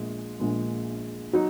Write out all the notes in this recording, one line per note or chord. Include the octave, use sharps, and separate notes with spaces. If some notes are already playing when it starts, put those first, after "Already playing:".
Already playing: A#1 A#2 G#3
A#1 A#2 G#3
F#3 D#4